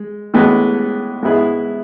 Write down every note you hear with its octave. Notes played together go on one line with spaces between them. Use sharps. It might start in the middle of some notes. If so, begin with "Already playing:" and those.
Already playing: G#3
A2 E3 G#3 B3
G#2 G#3 B3 E4 G#4